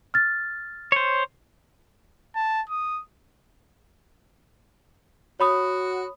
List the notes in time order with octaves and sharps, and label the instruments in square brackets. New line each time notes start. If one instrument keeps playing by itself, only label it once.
[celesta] F6 A6
[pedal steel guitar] C5 C#5
[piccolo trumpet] A5
D#6
[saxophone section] F#4 [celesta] C#5 B5 D#6